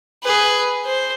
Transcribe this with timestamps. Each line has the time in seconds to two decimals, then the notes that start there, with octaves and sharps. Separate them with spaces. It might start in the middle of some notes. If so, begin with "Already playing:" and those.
0.23 G#4 B4
0.85 C5